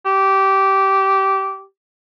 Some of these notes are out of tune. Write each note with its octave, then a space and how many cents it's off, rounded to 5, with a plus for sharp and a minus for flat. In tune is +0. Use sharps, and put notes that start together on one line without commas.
G4 -15